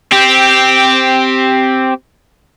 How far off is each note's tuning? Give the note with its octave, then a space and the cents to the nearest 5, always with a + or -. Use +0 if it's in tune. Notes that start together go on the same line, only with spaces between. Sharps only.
C4 +0 G4 -5